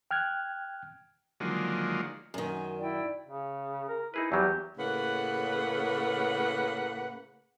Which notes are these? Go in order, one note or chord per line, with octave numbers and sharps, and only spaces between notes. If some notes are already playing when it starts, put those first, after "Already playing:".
G5 F6 F#6 G#6
D3 D#3 F3 F#3 G#3 A#3
F#2 D#3 G#5
E4 D5 G5
C#3
A#4
D#4 E4 G#4 B4
E2 F#3 G3 G4
A2 C#3 A#3 B4 F#5